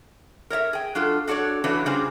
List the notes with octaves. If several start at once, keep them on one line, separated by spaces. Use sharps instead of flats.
A#4 C#5 D5 E5
G#4 G5
F#3 D4 F4 A4
D4 F#4 A4 C#5 D5
C#3 E3 F#3 D4 A4 B4
C#3 G3 D4 F4 G#4 C5